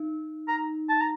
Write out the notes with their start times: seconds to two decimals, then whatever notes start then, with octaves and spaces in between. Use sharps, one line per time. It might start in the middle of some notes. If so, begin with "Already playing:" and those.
Already playing: D#4
0.48 A#5
0.89 A5
1.00 A#5